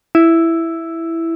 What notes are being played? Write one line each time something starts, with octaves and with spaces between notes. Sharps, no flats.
E4